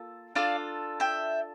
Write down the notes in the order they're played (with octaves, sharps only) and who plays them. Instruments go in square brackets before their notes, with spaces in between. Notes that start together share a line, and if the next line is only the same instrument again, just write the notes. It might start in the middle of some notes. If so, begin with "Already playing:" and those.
Already playing: [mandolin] A#3 F4 A4
D4 F4 A4 D5 F5
E5 G5